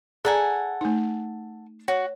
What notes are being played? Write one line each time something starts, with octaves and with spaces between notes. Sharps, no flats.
G#4 A4 D5 F#5 G#5 A#5
A3 D#4
F#4 C#5